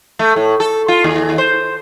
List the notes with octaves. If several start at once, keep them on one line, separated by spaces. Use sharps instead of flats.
A3
A2
A4
F4
D#2
C5